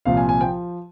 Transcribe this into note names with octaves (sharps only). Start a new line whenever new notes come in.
C2 A#2 F3 F5
G#5
G#5
F3 G5